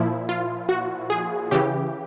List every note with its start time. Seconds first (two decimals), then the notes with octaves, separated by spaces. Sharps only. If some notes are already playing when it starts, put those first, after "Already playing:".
Already playing: A#2 F3 E4
0.29 F4
0.69 F#4
1.10 G#4
1.51 C#3 E3 G4